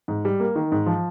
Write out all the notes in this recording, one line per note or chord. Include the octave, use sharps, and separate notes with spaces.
G#2
G3
A#3
D#3
G#2
F3